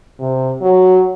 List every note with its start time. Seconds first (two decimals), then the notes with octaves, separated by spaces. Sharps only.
0.20 C3
0.62 F#3